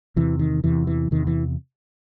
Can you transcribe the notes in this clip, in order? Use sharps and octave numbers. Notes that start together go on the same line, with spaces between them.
E2 C3 E3
D#3
E2 C3 E3
E3
E2 C3 D#3
E3